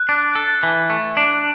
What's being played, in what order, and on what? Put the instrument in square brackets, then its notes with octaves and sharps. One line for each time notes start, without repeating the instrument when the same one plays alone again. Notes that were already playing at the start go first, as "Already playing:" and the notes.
Already playing: [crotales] F#6
[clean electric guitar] D4
A4
E3
A3
D4